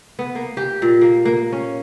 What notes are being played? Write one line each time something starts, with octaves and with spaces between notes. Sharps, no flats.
B3
A#3
G4
A#2
A#3
A#3
C#4